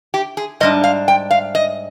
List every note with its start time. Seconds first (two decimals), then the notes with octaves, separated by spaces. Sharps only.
0.14 G4
0.37 G#4
0.60 G#2 G3 D4 D#5
0.84 F5
1.08 G5
1.31 F5
1.55 D#5